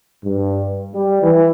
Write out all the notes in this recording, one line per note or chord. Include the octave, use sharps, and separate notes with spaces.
G2
G3
E3